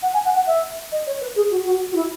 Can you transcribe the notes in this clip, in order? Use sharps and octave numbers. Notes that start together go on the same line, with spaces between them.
F#5
G#5
F#5
F#5
E5
D#5
C#5
B4
G#4
F#4
F#4
F#4
E4